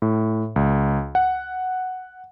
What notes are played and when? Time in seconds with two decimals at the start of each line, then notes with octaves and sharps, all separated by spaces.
0.02 A2
0.56 C#2
1.15 F#5